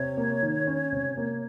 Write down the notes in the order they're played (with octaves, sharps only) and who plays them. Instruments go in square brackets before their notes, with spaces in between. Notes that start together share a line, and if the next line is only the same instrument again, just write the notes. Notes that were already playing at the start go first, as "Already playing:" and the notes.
Already playing: [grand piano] C3 [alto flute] C#5
[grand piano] A#3
D#3
C#4
C3
A#3